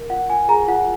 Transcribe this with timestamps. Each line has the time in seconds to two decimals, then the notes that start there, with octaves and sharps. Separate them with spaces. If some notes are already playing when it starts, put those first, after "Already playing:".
Already playing: A#4
0.10 F4 F#5
0.30 F4 G#5
0.49 G#4 A#5
0.68 F4 F#5